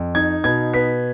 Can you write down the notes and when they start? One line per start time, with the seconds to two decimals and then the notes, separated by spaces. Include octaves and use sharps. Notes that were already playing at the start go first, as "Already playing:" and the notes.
Already playing: F2
0.15 D#4 G#6
0.44 B2 G#6
0.74 B3 B6